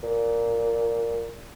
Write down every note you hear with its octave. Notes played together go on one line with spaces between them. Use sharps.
A#2